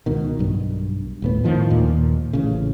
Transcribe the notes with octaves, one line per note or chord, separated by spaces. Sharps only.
C#2 B2 D#3
B1 G2
D#1 A2 B3
A2 C3 D#3 F3
D#2 A#2
A1 C#3